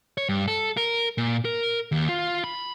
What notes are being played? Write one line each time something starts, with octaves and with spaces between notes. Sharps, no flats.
C#5
G2
A4
A#4
A#2
A#4
D#2
F4
B5